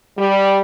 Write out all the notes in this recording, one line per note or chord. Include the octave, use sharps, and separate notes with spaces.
G3